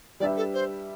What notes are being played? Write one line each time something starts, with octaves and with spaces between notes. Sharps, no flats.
G3 D4 G4 B4 D5 E5
A4
C5